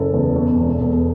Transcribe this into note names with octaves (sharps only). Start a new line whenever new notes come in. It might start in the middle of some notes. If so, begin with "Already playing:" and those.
Already playing: F#1 A4
E2
B2
E1
E1